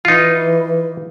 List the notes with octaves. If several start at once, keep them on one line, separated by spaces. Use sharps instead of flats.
E3 D#4 F4